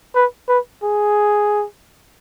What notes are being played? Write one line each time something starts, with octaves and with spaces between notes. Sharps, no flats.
B4
B4
G#4